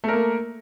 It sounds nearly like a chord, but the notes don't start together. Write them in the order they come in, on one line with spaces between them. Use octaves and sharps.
A3 A#4 A#3